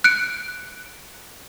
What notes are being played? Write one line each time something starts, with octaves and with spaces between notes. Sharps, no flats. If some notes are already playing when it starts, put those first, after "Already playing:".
F#6 C#7 D7